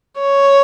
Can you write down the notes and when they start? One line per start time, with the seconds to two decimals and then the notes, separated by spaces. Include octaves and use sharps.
0.20 C#5